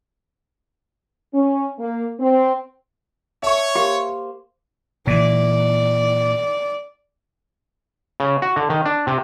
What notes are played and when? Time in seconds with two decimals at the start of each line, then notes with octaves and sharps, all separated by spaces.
1.34 C#4
1.78 A#3
2.20 C4
3.43 C#5 E5 A5 C#6
3.76 A#3 G4 C5
5.07 A#2 E3 D5
8.20 C#3
8.42 F#4
8.56 D3
8.70 D#3
8.86 D4
9.07 C3